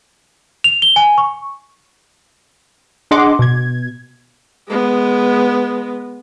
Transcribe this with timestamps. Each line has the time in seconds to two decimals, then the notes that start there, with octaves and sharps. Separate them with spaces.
0.64 F7
0.82 G7
0.96 G#5
1.18 C#6
3.11 D4 G#4 D#5 F#5 C6 D6
3.39 B2 G#6
4.68 G#3 B3